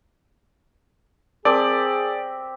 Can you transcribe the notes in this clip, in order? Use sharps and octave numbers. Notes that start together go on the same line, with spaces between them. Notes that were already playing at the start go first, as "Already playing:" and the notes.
C4 G4 G#4 A#4 D5 A5 D6